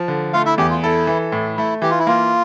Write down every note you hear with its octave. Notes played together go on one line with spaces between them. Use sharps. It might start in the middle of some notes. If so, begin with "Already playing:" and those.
Already playing: F3
D3
A3 F4 F5
E4 E5
E2 G4
F4
E4 A4
E3
A2
A3 E4
E3 G4
F4
E4
A#3 F4